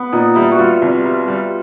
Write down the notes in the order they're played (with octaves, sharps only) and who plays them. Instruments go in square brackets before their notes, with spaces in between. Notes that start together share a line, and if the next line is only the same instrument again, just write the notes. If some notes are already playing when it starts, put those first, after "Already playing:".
Already playing: [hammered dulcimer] B3
[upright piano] A#2 [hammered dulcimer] D#4
[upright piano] G3 [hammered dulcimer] E4
[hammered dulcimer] F#4
[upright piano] G3 [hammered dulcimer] F4
[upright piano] C2
G3
G3